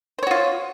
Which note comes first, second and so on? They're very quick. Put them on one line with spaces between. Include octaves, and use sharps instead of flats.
C5 C#5 F#4 F4